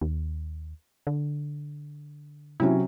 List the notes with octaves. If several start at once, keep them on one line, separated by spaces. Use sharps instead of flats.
D#2
D3
C3 F#3 C#4 E4